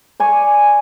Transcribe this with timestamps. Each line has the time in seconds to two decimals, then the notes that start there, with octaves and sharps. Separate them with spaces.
0.20 D5 G#5 C#6